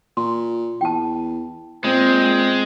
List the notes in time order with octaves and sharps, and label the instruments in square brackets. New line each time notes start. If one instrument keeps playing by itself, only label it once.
[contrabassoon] A#2 [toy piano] C6
[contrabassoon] E2 [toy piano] G5 A5
[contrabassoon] A#2 [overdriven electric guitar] G#3 [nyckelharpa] C4